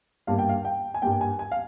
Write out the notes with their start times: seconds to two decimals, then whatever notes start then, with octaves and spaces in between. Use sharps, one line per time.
0.27 G2 G3 A#3 F5
0.39 G5
0.49 F5
0.65 G5
0.94 G#5
1.02 G2 G3 A#3 G5
1.21 G#5
1.39 G#5
1.52 F5